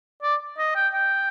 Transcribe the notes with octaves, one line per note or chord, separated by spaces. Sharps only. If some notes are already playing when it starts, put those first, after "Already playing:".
D5
D#5
G5
G5